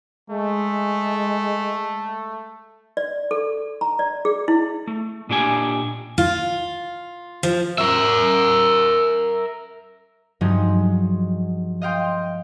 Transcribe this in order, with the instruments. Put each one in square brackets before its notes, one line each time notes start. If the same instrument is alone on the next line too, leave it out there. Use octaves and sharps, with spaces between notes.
[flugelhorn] G#3 [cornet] A3
[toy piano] D5
A4
A#5
D5
G#4
E4
[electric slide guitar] A3
A#2 D4 G4 G#5
[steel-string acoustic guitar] F4
F3
[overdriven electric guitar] A#4 E5
[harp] G2 F3 F#3 G#3 C4 D#4
D#5 F5 G5 C6